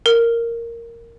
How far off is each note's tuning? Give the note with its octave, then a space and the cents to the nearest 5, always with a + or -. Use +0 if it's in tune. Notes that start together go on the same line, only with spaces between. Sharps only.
A#4 -5